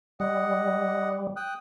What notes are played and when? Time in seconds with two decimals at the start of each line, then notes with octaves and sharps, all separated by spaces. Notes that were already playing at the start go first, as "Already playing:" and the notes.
0.20 G3 D#5 F#5
1.36 G5 D#6 F#6